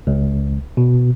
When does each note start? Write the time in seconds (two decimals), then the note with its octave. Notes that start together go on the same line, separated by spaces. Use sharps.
0.07 C#2
0.77 B2